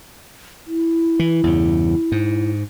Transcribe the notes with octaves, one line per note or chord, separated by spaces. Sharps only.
E4
E3
E2 G2 C#3
G#2